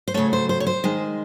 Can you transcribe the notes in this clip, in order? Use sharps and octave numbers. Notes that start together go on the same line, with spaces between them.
C5
C#3 F#3 A3 C#5
C5
C5
C#5
C5
D#3 G#3